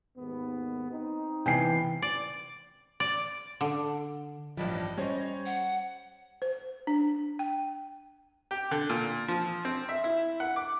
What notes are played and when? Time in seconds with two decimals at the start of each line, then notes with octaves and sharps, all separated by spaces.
0.17 D#2 G#2 B3
0.91 C4 D#4
1.46 C3 E3 B3 G5 G#5 C7
2.02 D5
3.00 D5
3.61 D3
4.57 A1 G2 F3 G3 D#5
4.97 G3 C#4 C5 C#5
5.46 F#5
6.42 C5
6.87 D4
7.39 G5
8.51 G4
8.71 D3
8.89 A#2
9.28 F3
9.65 C4
9.89 E5
10.04 E4
10.40 F#5
10.56 D6